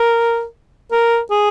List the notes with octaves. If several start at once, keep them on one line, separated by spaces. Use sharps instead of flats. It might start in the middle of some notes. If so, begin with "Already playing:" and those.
Already playing: A#4
A#4
G#4